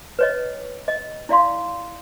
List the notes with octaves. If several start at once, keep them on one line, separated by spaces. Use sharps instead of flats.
B4 C#5 D#5
D#5
E4 D5 F5 C6